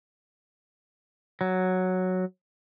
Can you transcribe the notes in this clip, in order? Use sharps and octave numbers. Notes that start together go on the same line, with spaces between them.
F#3